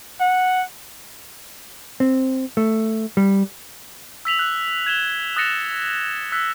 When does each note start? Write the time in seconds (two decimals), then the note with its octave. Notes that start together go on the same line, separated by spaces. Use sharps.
0.21 F#5
2.00 C4
2.57 A3
3.17 G3
4.25 E6 B6 F7 F#7
4.39 F#6
4.86 G#6 E7 G7
5.36 D#6 F#6 A6 A#6 C#7 E7
6.32 E6 F#6 B6